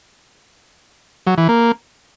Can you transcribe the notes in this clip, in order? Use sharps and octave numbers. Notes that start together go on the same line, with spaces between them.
F#3
E3
A#3